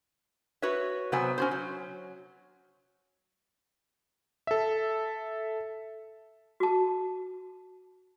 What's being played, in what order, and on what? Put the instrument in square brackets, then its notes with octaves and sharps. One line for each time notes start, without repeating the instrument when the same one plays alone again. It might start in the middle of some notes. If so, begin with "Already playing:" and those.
[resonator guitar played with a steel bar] F#4 B4 C#5 E5
C3 F#3 B3 C5 E5 G#5
C#4 F#4 C5
F#3
[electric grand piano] A4 E5
[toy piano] F#4 A5